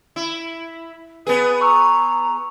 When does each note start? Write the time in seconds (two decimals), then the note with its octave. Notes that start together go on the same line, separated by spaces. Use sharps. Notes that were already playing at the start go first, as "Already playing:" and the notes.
0.16 E4
1.27 B3 G#4 B4
1.61 A#5 C#6 E6